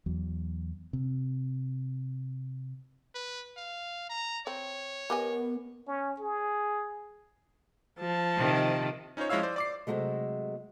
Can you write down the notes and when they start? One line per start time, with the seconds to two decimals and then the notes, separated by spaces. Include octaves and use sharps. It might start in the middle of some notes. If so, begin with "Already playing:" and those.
0.06 E2 F#3
0.93 C3
3.15 B4
3.57 F5
4.10 A#5
4.47 C4 C#5
5.10 B3 G4 A#4 D#5 G#5
5.88 C#4
6.20 G#4
7.99 F3 A5
8.37 C3 D#3
9.17 C#4 D#4 F4 C5 C#5
9.29 F3 G#3 E4 C#5 F5 E6
9.43 C5 D5
9.56 D5 D6 C7
9.87 C3 E3 F#3 G#3 A3